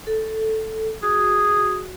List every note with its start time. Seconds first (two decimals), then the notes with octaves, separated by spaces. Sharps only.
0.07 A4
1.03 F#4 G#4